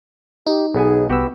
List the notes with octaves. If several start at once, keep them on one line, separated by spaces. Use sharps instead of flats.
D#4 G4
B1 B3 G#4 G#5
C2 B3 F#4 G4 E6